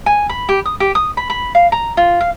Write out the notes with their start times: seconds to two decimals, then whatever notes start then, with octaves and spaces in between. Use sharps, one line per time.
0.06 G#5
0.29 B5
0.49 G4
0.66 D#6
0.80 G4
0.95 D#6
1.17 B5
1.30 B5
1.55 F5
1.72 A#5
1.97 F4
2.21 F5